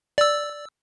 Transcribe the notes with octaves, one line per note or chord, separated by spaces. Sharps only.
D5 E6